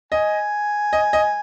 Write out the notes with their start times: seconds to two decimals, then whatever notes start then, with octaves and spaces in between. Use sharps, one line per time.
0.12 D#5 G#5
0.93 D#5
1.13 D#5